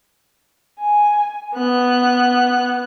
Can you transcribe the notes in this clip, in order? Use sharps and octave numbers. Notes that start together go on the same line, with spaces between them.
G#5
B3 F#6